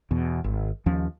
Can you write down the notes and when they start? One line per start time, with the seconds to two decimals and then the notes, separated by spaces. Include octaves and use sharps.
0.11 E2 B2
0.44 G#1
0.86 D#2 F3 C#4